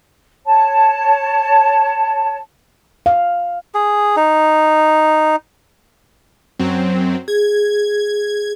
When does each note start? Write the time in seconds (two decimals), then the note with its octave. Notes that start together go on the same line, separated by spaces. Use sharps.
0.45 C#5 A5
3.06 F5
3.74 G#4
4.17 D#4
6.59 F#2 F#3 C4
7.28 G#4 G#6